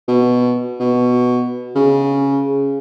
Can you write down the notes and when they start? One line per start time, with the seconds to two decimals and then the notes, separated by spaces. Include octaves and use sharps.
0.08 B2
0.80 B2
1.75 C#3